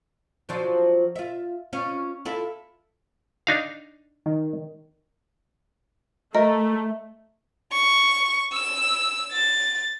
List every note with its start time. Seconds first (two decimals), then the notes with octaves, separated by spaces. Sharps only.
0.49 F3 F#3 D4
1.16 F4 E5
1.73 C#4 F4
2.25 E4 F4 A4
3.47 D4 D#4 F5
4.26 D#3
6.35 A3 A#4 D#5 E5
7.73 C#6
8.53 E6
9.32 A6